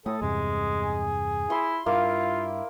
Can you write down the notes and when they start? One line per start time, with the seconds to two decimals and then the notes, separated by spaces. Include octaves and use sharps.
0.06 A2 A3 A4 D#6
0.22 E2 G2 C3 G#3 G#4
1.50 E4 C6
1.86 G2 A#3 E4 F4